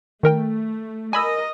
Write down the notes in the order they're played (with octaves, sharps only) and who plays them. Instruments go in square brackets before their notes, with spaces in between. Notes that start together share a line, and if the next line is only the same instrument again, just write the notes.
[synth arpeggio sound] D#3 A#4 G5 [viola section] A3
[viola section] A#4 D#5 [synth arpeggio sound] G#5 B5 E6